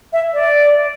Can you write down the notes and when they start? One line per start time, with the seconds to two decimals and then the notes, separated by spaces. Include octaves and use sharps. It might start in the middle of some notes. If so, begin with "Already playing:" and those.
0.12 E5
0.33 D5